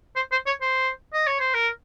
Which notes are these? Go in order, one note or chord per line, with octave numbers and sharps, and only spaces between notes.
C5
C5
C#5
C5
D#5
C#5
C5
A#4